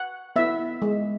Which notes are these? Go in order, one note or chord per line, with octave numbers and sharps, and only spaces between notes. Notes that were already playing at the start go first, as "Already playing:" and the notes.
Already playing: F#5
B3 E4 E5
G#3